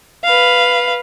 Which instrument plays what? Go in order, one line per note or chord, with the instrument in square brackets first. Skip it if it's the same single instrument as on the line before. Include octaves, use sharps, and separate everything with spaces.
[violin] B4 F5